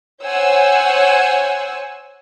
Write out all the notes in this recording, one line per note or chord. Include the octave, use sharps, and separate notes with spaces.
C5 C#5 F#5 G#5 E6